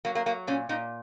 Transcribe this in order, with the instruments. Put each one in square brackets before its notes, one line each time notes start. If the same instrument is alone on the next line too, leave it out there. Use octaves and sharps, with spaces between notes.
[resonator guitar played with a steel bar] F#3 A#3
A#3
F#3 A#3
A#2 C#4
A#2 D#4